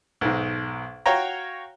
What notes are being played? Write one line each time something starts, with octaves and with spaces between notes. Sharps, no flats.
B1 G#2
F#4 C#5 F5 G5 A#5